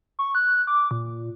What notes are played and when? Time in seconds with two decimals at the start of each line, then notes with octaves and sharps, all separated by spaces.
0.19 C#6
0.35 F#6
0.67 D6
0.91 A#2